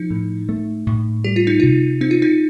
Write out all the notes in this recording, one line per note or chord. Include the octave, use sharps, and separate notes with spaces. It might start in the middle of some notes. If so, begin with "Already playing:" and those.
Already playing: F3 D#4
A2
A3
A2
G3 G4
F4
D#4
C3 F4
C4 D#4
F4
D#4